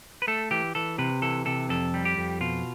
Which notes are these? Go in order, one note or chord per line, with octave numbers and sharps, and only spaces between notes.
B4
A3 A4
E3 G4
E3 A4
C3 B4
E3 A4
C3 A4
F2 A4
G3
G4
F2
B2 F4